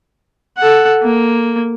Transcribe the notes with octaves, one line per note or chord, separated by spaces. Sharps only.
A4 F#5
A#3